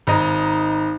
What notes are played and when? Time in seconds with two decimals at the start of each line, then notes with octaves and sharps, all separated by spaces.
0.07 G#1 D#4